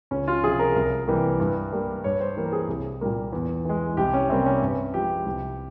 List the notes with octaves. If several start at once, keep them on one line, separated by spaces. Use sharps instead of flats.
C#2 C#4
F4
C3 F3 G#4
A#4
C2 A#4
C3 E3 G3 A#3
G2
G3 A#3
G2 C#5
C5
E3 G3 A#3
A#4
G#4
C2
A#2 G3 A#3
E2
E3 G#3
C2 G4
C#4
C3 G3 A#3 C4
C#4
G2
F3 G#3 G4
C2